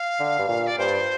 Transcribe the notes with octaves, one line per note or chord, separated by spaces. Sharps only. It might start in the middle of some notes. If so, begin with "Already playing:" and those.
Already playing: F5
D3
G2
A#2
D5
G2 C5